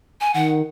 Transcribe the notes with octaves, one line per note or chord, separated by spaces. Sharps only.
G#5
D#3 F#5